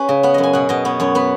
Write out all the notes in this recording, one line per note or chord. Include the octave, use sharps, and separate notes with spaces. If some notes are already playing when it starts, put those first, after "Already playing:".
Already playing: C#4 G#4 B4
C#3
B3 F#5
F#2 D#5
G#5
B2 F#5
B2 D#5
B3 C#5
F#2 C#5
B3 B4